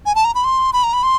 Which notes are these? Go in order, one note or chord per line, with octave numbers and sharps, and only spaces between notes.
G#5
A5
A#5
B5
C6
B5
A#5
B5
C6